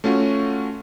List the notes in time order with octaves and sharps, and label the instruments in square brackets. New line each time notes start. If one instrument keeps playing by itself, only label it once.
[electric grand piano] A3 C#4 F4 F#4